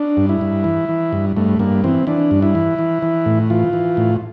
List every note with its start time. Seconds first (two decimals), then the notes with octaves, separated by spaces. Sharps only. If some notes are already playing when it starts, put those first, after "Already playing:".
Already playing: D4
0.17 G2
0.29 E4
0.41 G2
0.64 E3
0.89 E3
1.13 G2
1.36 G2 A3
1.59 G2 A#3
1.84 E3 C4
2.07 E3 D4
2.31 G2
2.42 E4
2.55 E3
2.79 E3
3.02 E3
3.26 A2
3.50 E3 F4
3.73 E3
3.97 A2